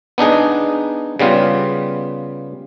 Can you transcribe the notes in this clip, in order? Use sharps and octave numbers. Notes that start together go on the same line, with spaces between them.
B3 D4 D#4 G#4
C#3 G3 B3 F4